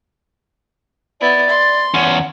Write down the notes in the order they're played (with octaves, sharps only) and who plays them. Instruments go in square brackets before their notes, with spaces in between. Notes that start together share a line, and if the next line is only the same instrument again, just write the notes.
[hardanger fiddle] B3 E4 [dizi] D5
[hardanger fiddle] C6
[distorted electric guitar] E2 C#4 [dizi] F#5